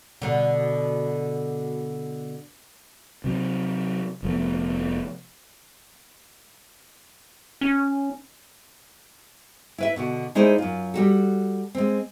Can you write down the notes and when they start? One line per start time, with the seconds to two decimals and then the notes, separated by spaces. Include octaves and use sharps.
0.22 B2 D3
3.24 C3 F#3 C4
4.23 F1 F3 A3 B3
7.61 C#4
9.78 E4 B4 E5
9.96 B2 D3 F#4
10.35 G#3 D#4 E4 G#4 C5 D5
10.58 F#2 F4
10.94 G3 F#4 A4
11.75 G#3 C4